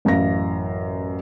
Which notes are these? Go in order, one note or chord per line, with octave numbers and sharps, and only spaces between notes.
A1 F#2 F5 A#6